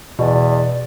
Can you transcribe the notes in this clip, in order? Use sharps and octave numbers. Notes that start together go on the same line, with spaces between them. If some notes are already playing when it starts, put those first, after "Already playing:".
E2 B2 D5